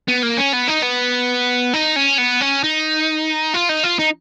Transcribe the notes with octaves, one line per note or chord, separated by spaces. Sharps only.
B3
A#3
C#4
B3
D#4
B3
D#4
C#4
B3
C#4
D#4
F4
D#4
F4
D#4